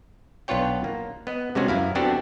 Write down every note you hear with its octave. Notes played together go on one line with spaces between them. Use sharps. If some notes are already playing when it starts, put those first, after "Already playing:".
B1 B3 D4 F4 C#5 G5
A#3
B3 D#5
C3 G#3 B3 C#4 F#4 G#4
F#2 E4 F5
B3 C4 D4 F#4 G4 A4